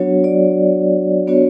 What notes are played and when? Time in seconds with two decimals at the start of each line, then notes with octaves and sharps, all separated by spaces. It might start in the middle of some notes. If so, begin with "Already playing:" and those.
Already playing: F#3 B3 D4 F#4 C#5
0.24 D5
1.27 B3 D4 F#4 C#5